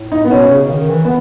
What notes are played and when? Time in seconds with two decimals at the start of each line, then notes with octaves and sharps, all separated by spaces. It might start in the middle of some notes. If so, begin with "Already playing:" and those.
Already playing: A2
0.12 D#4
0.25 B3
0.31 B2 C#4
0.51 C#3
0.70 D#3
0.90 E3
1.05 B3